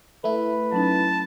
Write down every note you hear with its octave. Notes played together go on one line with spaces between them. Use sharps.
A3 E4 B4
F#3 C#4 D#4 A5